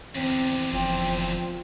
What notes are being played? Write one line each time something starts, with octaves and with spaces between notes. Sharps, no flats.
E2 D3 C4
F1 F3 C4